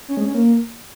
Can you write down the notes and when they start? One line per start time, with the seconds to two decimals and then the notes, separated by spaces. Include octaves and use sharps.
0.08 C#4
0.17 G#3
0.26 C#4
0.34 A#3